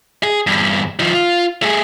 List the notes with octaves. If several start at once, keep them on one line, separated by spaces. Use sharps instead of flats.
G#4
E2 G2
D#3 F3
F4
A3 G#4